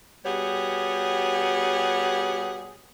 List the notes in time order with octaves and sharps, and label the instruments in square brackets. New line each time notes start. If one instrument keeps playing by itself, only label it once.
[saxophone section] B2 G3 G4 G#4 C#5 F#5